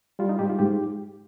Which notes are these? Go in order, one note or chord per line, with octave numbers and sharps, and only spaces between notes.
G3 F4
D#4
G#2 G4
F4
G#2 G4